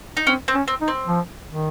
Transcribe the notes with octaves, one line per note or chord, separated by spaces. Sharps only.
D#4
C4 C#4
C4
C#4
C4
D#4
C4
F3
D#3